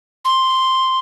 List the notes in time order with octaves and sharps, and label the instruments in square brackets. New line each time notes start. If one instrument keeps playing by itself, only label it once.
[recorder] C6